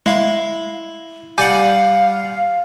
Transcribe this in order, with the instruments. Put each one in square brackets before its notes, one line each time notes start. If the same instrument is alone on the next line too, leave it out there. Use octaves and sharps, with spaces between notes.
[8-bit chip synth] G#3 F5 [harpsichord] E4
[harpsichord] G3 D5 F#5 [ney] F5 [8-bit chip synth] G#5 D6 G6